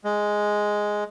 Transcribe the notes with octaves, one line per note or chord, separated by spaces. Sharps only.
G#3